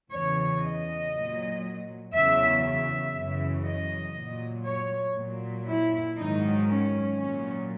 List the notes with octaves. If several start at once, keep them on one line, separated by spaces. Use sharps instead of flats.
E2 C#3 E3 C#5
D#5
A#2 F#3
E2 C#3 F#3 E5
E5
F#2 C#3 E3
D#5
A#2 F#3
C#5
A#2 F#3
E4
G#2 D#3 F#3 D#4
C#4
A#2 F#3 C#4